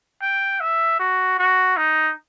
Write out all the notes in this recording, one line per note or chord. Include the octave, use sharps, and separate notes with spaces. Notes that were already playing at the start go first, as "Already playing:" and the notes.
G5
E5
F#4
F#4
D#4